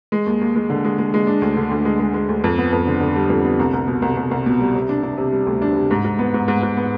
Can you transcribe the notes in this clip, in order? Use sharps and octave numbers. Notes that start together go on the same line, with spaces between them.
G#3
D#2
D#2
G#3
D3
G#3
G#3
G#3
D4
D2
D3
D2
G#3
G#3
G#3
D2
F2
B3
F2
D3
D3
G3
F2
B3
C2
C2
B2
C2
C2
C2
B2
G3
C3
D4
D4
C3
G3
D2
D4
C3
G#2
G#2
B3
G#2
G#2
G#2
B3